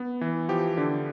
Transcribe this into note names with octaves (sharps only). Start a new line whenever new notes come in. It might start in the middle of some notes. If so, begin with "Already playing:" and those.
Already playing: B3
E3
F3 G4
D3